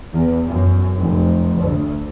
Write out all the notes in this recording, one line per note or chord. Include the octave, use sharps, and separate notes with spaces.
E2
F#2
F1
D2